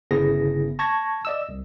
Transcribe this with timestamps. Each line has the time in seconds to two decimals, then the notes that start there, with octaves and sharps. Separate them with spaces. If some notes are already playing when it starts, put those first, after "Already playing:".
0.11 G1 C#3 B3 E4 G#4 A#6
0.79 A5 C#6 G#6 A#6
1.25 D5 D#5 E6
1.49 C2